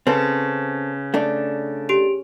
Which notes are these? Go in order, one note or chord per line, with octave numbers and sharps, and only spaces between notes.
C#3 C4 A4 B4
A3 D4
G4 D7 F7